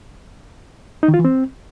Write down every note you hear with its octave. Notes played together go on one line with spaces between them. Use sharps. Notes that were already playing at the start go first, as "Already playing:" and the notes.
D#4
D#3
F4
E3
C4